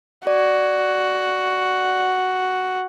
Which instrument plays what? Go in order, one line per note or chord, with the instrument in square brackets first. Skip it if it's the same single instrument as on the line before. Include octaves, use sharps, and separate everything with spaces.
[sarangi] F#4 [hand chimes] D5